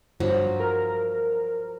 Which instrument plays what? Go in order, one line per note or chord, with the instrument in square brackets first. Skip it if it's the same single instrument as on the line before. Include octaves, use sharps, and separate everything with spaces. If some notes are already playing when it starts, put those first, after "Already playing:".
[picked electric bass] G2 [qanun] F3 F#3
[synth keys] A#4